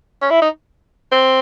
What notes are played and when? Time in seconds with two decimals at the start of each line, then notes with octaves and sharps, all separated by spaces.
0.22 C#4
0.31 E4
0.42 D#4
1.12 C4